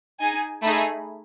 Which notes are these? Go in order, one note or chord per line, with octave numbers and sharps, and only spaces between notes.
D#4 G#4 G#5
A3 D#4 G#4 B5